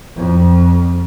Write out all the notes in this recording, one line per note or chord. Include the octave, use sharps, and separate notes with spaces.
F2